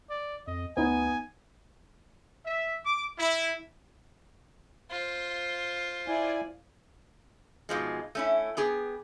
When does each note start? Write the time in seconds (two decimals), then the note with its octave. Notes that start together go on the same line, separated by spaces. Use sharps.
0.10 D5
0.47 F2 D#5
0.77 D2 B3 D#4 G#5
2.45 E5
2.85 D6
3.18 E4
4.91 F4 C5
6.08 E4 D5 G#5
7.69 G#2 B2 F3 G#3
8.15 A3 C#4 E4
8.57 B3 G4 G#4